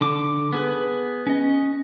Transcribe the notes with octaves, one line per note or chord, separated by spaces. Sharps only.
D3 D6
B3 G#4 B4
C#4 D#5